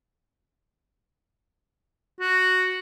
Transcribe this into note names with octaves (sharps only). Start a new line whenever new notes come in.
F#4